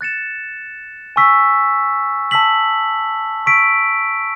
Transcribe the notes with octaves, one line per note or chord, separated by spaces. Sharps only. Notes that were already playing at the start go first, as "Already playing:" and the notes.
F#6 A6 C#7 E7
G#5 C#6 E6 B6
A5 E6 B6 F#7
C#6 E6 B6 D7